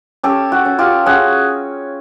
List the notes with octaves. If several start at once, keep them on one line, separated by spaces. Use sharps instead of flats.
C#4 G4 A4
F#4
C#4
F4 G4
C#4 F#4 G#4